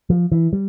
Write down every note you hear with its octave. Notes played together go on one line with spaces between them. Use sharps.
F3
E3
G3